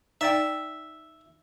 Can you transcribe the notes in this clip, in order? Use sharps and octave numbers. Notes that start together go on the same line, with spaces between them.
D#4 D5 E5 G5